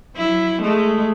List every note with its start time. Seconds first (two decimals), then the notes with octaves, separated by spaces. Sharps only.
0.16 F#3 E4
0.62 G#3 A3